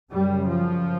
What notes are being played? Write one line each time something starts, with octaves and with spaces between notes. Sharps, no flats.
F#2 C#3 G3
F3